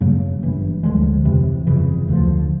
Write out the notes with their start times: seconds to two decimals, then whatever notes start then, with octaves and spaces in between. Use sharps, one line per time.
0.01 F#2 C#3 F#3 A#3
0.43 G1 G2 E3
0.83 D2 D3 F3 G#3
1.25 F2 C3 E3
1.67 G1 F2 C#3 E3
2.08 D2 D3 F3